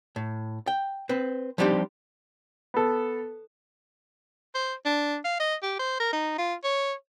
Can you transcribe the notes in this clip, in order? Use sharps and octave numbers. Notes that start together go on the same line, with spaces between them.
A2
G5
C4 B4
F3 G3 C4 D4 D#4 G4
B3 A4
C5
D4
F5
D#5
G4
C5
A#4
D#4
F4
C#5